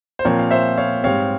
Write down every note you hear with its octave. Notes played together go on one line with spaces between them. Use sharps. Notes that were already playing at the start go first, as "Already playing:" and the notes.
C5
A#2 F3 C4 A#4 C#5
F5
C5 E5
C#5 F5
G#2 G3 C4 C#5 F5